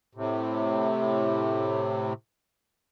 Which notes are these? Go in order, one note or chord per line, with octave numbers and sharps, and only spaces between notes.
A2 C3